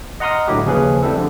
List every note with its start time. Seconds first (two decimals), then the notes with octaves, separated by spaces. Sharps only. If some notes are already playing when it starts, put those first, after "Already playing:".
0.20 D#5 F#5 A#5 C6 D#6 F6
0.48 A2 D3 F#3 E4 G4
0.66 D#2 C#3 F3 C#4 G#4 B4
1.03 G3 A3 C4 E4 A4
1.16 D3 F3